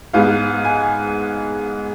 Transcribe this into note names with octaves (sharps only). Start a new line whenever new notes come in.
G#2 G#3 B3 F5
G#5